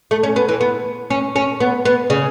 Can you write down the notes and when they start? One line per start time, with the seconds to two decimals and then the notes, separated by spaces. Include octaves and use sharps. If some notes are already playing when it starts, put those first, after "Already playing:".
0.11 A3
0.23 C#4
0.36 B3
0.49 E3
0.61 B3
1.10 C#4
1.36 C#4
1.60 B3
1.85 B3
2.10 C#3